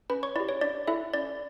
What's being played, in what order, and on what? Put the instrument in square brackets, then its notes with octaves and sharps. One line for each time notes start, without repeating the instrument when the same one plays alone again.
[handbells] C#4 B4 B5
C#5 C#6
E4 G4 D5
C#5
D4 D5
E4 A4 E5
C#4 D5